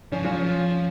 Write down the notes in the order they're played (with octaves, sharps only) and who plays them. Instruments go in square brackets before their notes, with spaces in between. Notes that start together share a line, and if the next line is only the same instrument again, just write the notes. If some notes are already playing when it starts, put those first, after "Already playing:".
[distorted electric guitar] F3 [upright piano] C#4
[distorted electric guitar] F#3 [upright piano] C#4 F4
[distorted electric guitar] F3